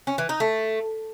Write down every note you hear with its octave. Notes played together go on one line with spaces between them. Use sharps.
C#4
E3
D#4
A3